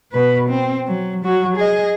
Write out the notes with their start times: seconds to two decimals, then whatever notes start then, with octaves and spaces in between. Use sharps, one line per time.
0.12 B2 B4
0.49 C4
0.87 F#3
1.25 F#3 F#4
1.56 G#4 D#5